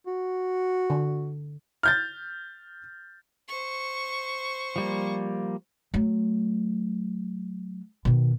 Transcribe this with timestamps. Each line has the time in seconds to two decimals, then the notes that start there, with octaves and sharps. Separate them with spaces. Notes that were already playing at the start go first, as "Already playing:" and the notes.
0.06 F#4
0.90 D3
1.83 F6 G6 A6
3.48 C5 C#6
4.76 F3 G3 A#3
5.94 F#3 A3
8.05 B2 D#3